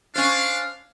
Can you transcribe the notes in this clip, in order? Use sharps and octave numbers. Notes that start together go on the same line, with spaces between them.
C#4 D4 C5 F5